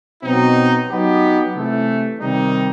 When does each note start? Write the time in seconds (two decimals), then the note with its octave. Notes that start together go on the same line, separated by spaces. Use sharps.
0.23 B2 F#3 C4 D#4
0.89 F#3 B3 D#4 G4
1.54 C3 E3 A3
2.20 C3 D#3 G3 D#4